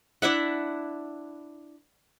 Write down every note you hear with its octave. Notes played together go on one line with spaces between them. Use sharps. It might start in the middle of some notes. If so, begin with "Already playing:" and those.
D4 E4 E5 F#5